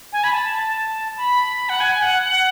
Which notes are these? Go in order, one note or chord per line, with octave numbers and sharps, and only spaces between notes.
G#5
B5
A5
B5
F#5
G#5
F#5
F#5